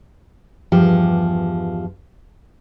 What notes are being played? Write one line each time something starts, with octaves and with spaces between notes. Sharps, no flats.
E2 G2 F3 G4